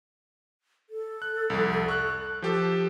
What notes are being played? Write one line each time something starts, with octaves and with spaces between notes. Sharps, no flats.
A4
F#6
C2 F2
C#6 F#6
F3 G4 A4